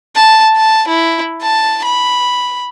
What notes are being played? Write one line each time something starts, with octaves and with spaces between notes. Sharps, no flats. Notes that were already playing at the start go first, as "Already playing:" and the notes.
A5
A5
E4
A5
B5